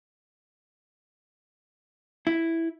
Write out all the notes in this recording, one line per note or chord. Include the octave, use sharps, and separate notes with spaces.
E4